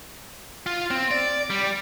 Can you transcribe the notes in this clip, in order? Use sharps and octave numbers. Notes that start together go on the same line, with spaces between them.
F4
C4
D5
G3